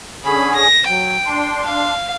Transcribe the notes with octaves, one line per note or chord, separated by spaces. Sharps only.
D3 C#4 G#4 B5
A#6
F#3 G5
D4 C6
F5